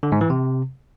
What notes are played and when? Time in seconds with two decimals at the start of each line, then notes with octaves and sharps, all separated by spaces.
0.03 D3
0.12 G#2
0.21 E3
0.30 C3